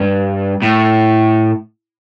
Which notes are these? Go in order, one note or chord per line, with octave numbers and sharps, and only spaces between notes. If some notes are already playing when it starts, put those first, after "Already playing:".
Already playing: G2
A2